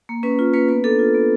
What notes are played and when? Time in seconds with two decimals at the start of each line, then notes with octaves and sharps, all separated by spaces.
0.09 A#3
0.23 C#4 B4
0.39 F4
0.54 A#3 B4
0.69 B3 B4
0.84 D4 A4
0.99 F4
1.15 B3